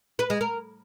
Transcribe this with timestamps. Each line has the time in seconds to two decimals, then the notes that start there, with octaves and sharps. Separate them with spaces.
0.19 B4
0.30 G#3
0.41 A#4